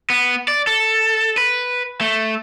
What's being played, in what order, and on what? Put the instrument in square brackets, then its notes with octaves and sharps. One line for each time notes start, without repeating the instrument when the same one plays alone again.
[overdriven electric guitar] B3
D5
A4
B4
A3